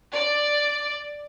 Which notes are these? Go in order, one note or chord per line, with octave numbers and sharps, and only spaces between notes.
D5